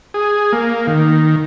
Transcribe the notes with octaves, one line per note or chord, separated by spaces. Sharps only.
G#4
A#3
D#3